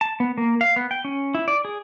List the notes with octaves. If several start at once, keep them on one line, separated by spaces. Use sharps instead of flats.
A5
B3
A#3
F5
B3
G5
C#4
E4
D5
G#4